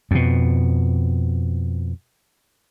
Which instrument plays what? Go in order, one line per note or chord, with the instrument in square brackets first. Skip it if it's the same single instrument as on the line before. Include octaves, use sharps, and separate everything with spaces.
[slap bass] F2 B2